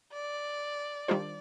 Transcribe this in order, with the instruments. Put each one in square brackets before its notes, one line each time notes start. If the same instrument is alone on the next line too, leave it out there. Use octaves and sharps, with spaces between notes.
[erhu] D5
[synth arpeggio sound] D#3 G3 D4 F4 C5